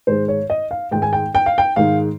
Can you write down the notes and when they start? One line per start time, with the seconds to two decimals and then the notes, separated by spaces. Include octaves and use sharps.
0.07 G#2 D#3 G#3 C5
0.28 C#5
0.50 D#5
0.71 F5
0.91 G#2 D#3 G#3 G5
1.02 G#5
1.13 G5
1.35 G5
1.46 F5
1.58 G5
1.76 G#2 D#3 G#3 F5